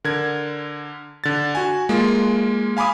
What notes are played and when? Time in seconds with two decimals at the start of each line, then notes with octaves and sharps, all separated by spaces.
0.04 D3 A#4 G#6
1.24 D3 A6
1.55 F#4 G#5
1.89 G#3 A#3 F4
2.77 F5 G#5 B5 D6 D#6